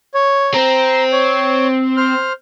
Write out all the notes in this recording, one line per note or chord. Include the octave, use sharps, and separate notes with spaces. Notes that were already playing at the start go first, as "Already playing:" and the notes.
C#5
C4 A#5
C#5
C5 F6